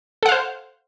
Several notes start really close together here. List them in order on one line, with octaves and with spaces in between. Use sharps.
A4 F#5 F5 C5